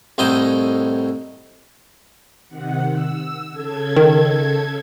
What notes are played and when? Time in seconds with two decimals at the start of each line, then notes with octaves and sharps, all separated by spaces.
0.18 C2 A2 D#4 C5 D#5
2.49 C3 D#3 F#5
2.92 E6
3.51 C#3 A4 G#6
3.96 D#3